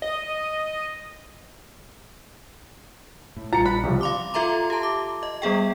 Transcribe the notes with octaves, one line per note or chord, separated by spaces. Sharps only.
D#5
A2
A#1 E3 G3 F4 A#5 A6 C#7
B5 F#6
C2 C#3 F3 G3
F5 C6 D6
F4 A4 E5 A#5 C6
G4 A5
D6
D#5
G3 B3 G#4 G5